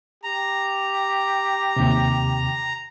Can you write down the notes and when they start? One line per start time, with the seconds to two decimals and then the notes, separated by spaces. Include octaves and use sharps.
0.24 G4 A#5
1.76 D#2 C3